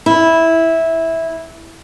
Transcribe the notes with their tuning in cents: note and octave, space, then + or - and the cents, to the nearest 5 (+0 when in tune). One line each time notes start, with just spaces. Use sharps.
E4 -10